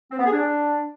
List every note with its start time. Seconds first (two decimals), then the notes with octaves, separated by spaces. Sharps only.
0.11 C4
0.18 B3
0.25 G#4
0.32 D4